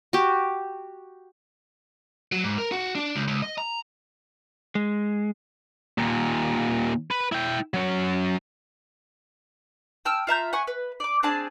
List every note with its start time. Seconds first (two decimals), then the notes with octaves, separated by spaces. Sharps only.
0.13 F#4 G4
2.32 F#3
2.44 G#2
2.58 A#4
2.72 F#4
2.95 D4
3.16 C#2
3.28 C#2
3.42 D#5
3.58 A#5
4.75 G#3
5.98 D#2 A#2
7.11 B4
7.32 E4 G5
7.74 F#3 C#4
10.05 G5 A5 E6 F6
10.27 F4 E5 A#5 G6
10.53 F#5 G#5 C#6
10.67 B4
11.00 D5 D6
11.23 C4 D4 G#4 A5